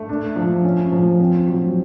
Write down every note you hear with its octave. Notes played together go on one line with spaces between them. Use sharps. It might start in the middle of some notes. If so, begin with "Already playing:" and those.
Already playing: A3
D4
F3
C#4
F3
C4
F#3